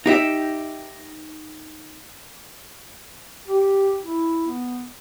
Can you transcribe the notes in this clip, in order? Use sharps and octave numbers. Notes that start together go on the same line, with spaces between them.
D#4 G4 E5
G4
E4
B3